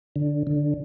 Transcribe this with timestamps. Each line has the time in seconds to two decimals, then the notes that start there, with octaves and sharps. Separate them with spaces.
0.16 D3
0.47 D3